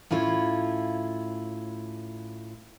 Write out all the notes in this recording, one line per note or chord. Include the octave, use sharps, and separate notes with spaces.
A2 C#4 E4 F4